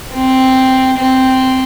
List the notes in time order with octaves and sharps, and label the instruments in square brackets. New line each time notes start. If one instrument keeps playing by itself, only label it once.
[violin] C4
C4